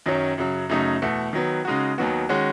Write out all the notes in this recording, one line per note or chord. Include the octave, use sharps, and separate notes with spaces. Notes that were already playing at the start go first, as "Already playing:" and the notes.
F#2 D#3 F#3 C#4
F#2 C#3 F#3
F#2 C#3 F#3 A3 D#4
E2 B2 A3
D#3 F#3 B3
C#3 G#3 D#4 F#4
D#2 D#3 F#3 B3 F#4
D#3 G#3 C#4 F#4